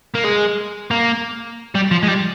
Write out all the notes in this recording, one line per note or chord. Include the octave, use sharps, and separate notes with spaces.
A#3
G#3
A#3
G3
F3
G#3
G3